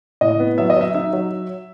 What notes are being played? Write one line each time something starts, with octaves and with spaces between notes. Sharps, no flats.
A2 D#5
B3
F#3 E5
D#5
F#3 E5
D#4 E5
F#3